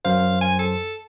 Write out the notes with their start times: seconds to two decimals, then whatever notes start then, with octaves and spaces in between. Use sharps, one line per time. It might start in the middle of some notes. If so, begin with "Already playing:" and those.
0.05 F#2 C5 F5
0.41 G#5
0.59 A4